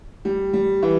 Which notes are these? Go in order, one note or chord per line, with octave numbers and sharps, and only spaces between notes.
G3
G3
E3